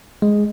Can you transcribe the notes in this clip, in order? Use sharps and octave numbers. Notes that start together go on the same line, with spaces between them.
G#3